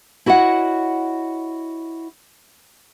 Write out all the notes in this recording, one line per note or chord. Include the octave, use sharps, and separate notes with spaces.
E4 F#4 C#5 D#5 F#5